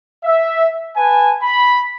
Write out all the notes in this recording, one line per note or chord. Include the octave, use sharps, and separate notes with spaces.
E5
B4 G#5 A5
B5